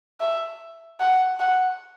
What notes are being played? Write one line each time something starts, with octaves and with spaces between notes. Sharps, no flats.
E5
F#5
F#5